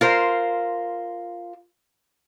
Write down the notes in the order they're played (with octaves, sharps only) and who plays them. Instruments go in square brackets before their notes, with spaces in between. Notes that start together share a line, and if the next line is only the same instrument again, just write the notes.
[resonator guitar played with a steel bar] F4 A#4 C5